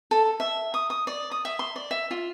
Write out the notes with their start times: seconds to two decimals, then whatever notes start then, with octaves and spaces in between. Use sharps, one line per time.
0.11 A4
0.40 E5
0.74 D#6
0.90 D#6
1.07 D5
1.31 D#6
1.45 E5
1.59 C6
1.76 D5
1.91 E5
2.11 F4